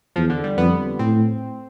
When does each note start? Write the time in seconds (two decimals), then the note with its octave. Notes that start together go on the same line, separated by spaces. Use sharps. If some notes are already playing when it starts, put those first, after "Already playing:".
0.16 E2 F3
0.30 D3
0.44 G3
0.57 F2 B3
0.99 A2 C4